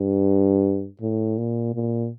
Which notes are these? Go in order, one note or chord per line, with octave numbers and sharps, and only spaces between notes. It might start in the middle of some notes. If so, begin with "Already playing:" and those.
Already playing: G2
A2
A#2
A#2